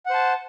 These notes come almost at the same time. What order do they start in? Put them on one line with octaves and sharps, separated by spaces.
F#5 C5 A5